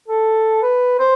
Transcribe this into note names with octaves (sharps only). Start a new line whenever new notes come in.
A4
B4
C5